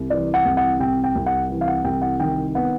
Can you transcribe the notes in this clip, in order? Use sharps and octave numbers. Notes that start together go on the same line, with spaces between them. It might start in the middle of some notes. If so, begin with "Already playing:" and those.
Already playing: C2
E3 D5
F#5
C2
F#5
C3 G5
G5
C2
F#5
E3
F5
F#5
C2 G5
F#5
D#3 G5
B3 F#5